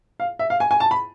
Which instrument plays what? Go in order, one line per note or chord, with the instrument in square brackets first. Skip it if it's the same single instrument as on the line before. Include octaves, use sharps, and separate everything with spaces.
[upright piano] F5
E5
F5
G#5
G#5
A5
B5